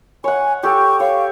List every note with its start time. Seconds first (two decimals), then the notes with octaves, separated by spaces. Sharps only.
0.24 C#5 F#5 G#5
0.63 G4 A4 C#6
1.00 C#5 F5